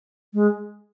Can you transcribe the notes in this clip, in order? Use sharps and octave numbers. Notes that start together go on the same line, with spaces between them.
G#3